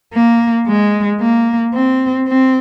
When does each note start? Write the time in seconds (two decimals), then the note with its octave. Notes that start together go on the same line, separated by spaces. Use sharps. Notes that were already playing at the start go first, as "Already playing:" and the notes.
0.14 A#3
0.67 G#3
1.20 A#3
1.74 C4
2.27 C4